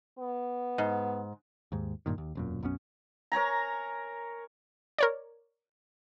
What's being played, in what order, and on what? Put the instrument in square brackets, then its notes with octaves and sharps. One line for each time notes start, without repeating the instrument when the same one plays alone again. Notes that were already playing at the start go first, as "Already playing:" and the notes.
[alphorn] B3
[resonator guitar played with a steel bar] G#2
[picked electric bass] D#2 G#2
G1 G2 A#2 D#3
D#2
E1 F#2 A#2
B1 F#2 B3 C#4
[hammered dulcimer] A#4 C#5 G#5 A#5
[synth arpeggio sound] A#4 C#5 D5